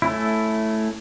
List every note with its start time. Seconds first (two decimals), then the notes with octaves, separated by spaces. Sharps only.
0.02 A3 C#4 E4